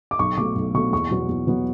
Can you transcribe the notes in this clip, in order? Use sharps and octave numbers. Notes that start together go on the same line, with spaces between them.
D6
B1 C#6
B2 A3 D6
B1
B2 A3 C#6
E2 C#6
B2 F#3 B3
E2
B2 F#3 B3